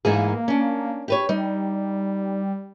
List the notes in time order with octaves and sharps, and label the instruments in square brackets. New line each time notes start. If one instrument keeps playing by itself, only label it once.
[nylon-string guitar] G#2 E3 G#4 [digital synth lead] A#3
[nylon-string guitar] C#4 D4
G4 B4 C#5
[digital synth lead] G3 [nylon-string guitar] D#4